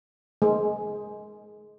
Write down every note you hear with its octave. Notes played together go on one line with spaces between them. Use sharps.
G#3